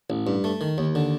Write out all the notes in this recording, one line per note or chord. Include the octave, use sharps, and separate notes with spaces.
A1
G2
A3
D#3
D#2
D3